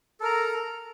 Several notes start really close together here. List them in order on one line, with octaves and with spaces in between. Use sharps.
A4 A#4 A#5